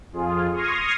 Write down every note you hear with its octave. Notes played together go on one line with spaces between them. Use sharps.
F2 F4 G#4
C6 C#6 D#6 F6 G#6 A#6